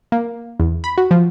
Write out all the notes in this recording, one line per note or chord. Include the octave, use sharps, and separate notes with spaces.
A#3
E2
B5
F#4
F3